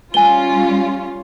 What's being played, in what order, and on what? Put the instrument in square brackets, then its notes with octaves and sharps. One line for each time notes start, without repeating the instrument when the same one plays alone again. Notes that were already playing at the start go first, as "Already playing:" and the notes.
[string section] G3 C#4 F4 [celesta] G#5 G7